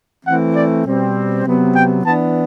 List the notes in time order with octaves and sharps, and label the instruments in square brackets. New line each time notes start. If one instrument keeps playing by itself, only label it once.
[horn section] E3 A3 C4 F#5
D5
B2 G3 C4
C3 F#3 B3
G5
E3 B3 D4 A5